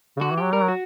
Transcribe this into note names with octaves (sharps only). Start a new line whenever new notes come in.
C#3
D3 F#4
E3
F#3 G4
G3 A#4
F#3
F#4